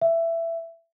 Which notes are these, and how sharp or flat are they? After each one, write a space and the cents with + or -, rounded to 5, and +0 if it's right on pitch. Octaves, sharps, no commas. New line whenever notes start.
E5 +15